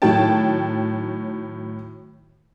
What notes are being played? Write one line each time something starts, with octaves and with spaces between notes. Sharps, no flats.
A2 D#3 F#3 C#5 G5 A5